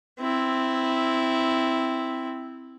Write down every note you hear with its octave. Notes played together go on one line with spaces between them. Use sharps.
C4 E4